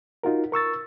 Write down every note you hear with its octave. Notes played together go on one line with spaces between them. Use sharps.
D#4 F4 F#4 A#4
A#4 C#6 E6 A6